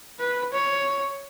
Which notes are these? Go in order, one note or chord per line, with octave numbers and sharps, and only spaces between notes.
B4
C#5